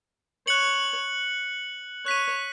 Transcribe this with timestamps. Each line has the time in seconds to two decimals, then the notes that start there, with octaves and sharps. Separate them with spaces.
0.47 C#5 F#6 C#7 F#7
2.06 C#5 F#6 B6 D#7